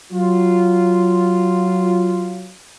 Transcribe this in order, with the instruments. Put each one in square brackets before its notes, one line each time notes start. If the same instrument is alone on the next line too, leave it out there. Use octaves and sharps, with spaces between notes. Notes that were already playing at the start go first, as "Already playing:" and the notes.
[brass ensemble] F#3 F4